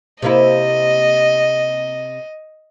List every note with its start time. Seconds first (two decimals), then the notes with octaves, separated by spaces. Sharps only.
0.22 C3 A#3 E4 D#5